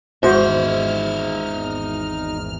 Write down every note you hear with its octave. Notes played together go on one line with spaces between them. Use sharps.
G#1 E2 G#2 D#4 F#4 C5 E5 F6